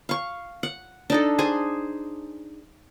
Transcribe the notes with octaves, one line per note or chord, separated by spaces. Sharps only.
F5 C#6
F#5
D4 D#4 A4
G#4 C5 G#5